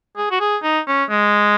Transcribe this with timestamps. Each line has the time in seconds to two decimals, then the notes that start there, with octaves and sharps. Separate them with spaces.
0.17 G#4
0.31 F#4
0.40 G#4
0.63 D#4
0.87 C#4
1.10 G#3